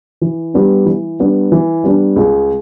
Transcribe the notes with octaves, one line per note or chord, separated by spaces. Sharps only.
E3
G3 B3 D4
E3
G3 B3 D4
E3
G3 B3 D4
C#2